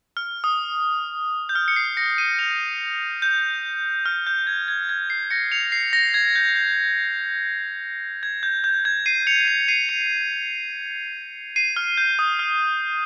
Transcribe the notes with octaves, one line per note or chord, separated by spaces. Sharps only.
F6
D#6
G6
F6
C#7
C7
A#6 C#7
C7 D#7
C#7 F7
G6
F6
G6
G#6
G#6
G#6
C7
A#6 C#7
C#7 F7
C7
A#6
G#6
G6
G6
G#6
G6
G6
G#6
C7 D#7
C#7 F7
C7 D#7
C7 D#7
C#7 F7
C7 D#7
F6
G6
D#6
F6